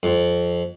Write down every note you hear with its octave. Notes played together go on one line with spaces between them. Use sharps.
F2